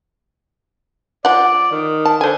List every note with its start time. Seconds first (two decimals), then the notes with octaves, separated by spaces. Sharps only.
1.25 F3 D5 F#5
1.72 D#3
2.05 A5
2.21 D3 C5 G#5